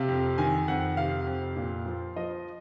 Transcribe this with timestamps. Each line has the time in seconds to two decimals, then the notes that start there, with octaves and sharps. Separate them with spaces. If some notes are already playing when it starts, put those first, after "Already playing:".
Already playing: C3 F5
0.08 F2
0.38 D#3 G#5
0.68 F2 F#5
0.97 C3 F5
1.27 F2
1.56 A#2
1.86 F3
2.16 F3 D#5